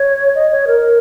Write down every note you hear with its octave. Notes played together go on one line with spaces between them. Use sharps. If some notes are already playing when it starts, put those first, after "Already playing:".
Already playing: C#5
D#5
C#5
A#4